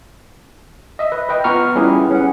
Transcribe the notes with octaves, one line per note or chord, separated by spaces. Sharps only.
D#5 E5
B4
B4 D#5 G5
B3 F4 A#5 C#6 F6
G3 C#4 E4 G4 G#4 B4
C#4 F#5